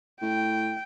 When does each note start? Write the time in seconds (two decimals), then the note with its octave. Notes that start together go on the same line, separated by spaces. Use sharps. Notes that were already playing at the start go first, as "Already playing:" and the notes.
0.22 A2 G5